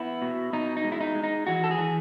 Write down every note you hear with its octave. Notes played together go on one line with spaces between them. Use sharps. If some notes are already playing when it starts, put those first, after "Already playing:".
Already playing: B3 E4
B2
B2 D#4
D#4
G#3
E4
D#4
G#3
D#4
E3 F#4
A4
G#4
E3